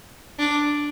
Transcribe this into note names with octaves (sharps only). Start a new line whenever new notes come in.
D4